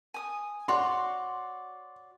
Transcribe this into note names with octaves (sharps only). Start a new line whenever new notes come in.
G#5 D#6
F#4 C#5 D5 C6